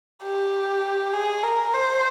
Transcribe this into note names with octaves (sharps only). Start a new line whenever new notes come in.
G4
G#4
A#4
C5